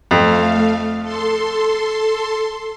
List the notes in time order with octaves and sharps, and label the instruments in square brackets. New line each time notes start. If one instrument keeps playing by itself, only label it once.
[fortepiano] F2 [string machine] A3 F5
[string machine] A4 C6